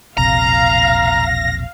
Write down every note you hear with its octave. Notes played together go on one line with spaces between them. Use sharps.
E1 A#1 C3 F5 A#5 A#6